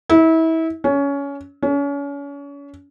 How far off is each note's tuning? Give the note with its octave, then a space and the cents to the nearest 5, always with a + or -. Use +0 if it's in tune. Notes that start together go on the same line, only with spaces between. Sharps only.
E4 -30
C#4 +20
C#4 +35